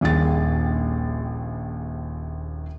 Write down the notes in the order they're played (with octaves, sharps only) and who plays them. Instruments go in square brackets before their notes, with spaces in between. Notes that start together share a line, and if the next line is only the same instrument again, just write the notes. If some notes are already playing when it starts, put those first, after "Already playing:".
[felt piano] D#1 A#1 D#2 G#4 A6